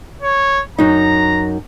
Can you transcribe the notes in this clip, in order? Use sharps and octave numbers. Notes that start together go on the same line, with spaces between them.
C#5
F#2 D#4 A#5